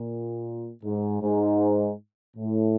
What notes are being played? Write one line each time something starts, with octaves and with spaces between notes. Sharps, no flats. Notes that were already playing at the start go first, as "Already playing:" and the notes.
Already playing: A#2
G#2
G#2
A2